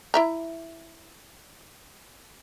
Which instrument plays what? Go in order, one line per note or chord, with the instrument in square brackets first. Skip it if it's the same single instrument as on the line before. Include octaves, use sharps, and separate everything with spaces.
[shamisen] E4 E5 A#5